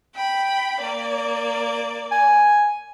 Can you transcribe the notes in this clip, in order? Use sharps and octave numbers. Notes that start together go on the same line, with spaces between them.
G5 B5
A#3 D5
G#5